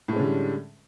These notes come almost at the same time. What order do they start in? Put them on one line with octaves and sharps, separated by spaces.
A2 G#3 C#4 D3 G3